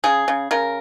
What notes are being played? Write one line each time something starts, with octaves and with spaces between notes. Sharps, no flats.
C#3 G#4
C#3
C#3 A#4